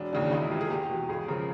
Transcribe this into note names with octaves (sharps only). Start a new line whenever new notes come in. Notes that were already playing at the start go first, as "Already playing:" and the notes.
Already playing: E1 D4
D#2 C#3 E3 D4
C#2 D#4
E4
C3 E3 F4
G#4
E2 G4
B2
C#2 G#4
C#3 F3 A#4